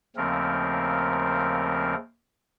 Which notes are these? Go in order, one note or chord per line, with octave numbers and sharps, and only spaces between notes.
D#2 C#3 F3 A3 C4 A#4